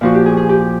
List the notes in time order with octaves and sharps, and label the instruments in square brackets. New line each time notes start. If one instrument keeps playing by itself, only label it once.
[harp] A#2 F3 F#4
G4
G#4
G#4
G4